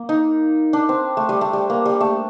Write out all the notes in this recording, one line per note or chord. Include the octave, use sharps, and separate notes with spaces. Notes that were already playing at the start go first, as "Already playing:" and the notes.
Already playing: A#3
D#4
D4
C4
A3
G3
A3
G3
A#3
G3
A3